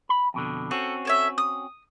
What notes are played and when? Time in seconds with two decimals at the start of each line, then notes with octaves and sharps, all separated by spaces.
0.09 B5
0.34 F2 B2 D3
0.71 C4 C#4 F#4 A4
1.05 A4 C#5 E5
1.38 D#6